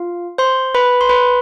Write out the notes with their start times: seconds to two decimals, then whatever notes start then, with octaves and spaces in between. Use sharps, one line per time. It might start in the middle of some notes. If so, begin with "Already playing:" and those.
Already playing: F4 F5
0.38 C5 C6
0.75 B4 B5
1.01 C6
1.09 B4 B5